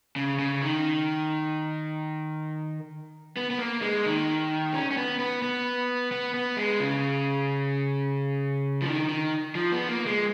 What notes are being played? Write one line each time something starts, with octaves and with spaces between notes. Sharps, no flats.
C#3
C#3
D#3
B3
B3
A#3
G#3
D#3
C#4
C#4
B3
B3
B3
B3
B3
G#3
C#3
F3
D#3
D#3
F3
B3
A#3
G#3